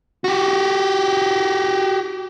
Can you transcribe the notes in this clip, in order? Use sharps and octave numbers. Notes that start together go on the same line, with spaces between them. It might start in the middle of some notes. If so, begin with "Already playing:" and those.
F#4 G4